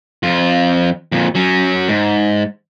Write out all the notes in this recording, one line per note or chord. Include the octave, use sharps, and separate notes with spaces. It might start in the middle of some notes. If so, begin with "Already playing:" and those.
F2 F4
F2 A#2
F#3 C#4
G#2